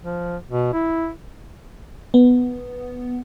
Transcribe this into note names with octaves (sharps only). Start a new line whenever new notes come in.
F3
B2
E4
B3